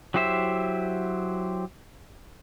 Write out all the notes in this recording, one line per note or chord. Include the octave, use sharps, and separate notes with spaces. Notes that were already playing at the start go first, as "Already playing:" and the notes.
F#3 E4 G4 C5 E5